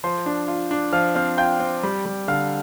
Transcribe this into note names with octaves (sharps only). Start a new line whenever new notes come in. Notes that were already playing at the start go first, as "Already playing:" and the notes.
F3 C5 C6
D4
F4
D4
F3 F5 F6
C4 F5 F6
F4 G5 G6
C4
G3
G3
D3 F5 F6